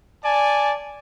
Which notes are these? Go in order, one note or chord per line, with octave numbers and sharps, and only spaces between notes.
D5 G#5 A5